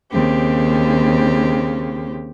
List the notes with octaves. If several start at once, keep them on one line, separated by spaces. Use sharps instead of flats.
D#2 C#3 C4 G4